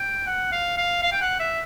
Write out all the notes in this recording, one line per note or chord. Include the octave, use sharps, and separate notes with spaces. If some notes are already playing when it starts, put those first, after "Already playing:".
Already playing: G5
F#5
F5
F5
F5
G5
F#5
E5